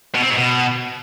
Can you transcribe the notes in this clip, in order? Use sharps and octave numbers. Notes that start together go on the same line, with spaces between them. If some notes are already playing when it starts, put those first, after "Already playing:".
B2
C4
G#2
B2